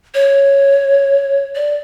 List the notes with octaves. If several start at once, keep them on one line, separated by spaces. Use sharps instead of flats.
C#5
D5